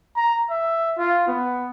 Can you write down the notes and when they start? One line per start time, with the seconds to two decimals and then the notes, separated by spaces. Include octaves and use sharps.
0.17 A#5
0.50 E5
0.98 F4
1.27 B3